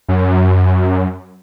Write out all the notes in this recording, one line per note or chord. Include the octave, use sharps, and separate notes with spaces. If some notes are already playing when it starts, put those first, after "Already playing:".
F#2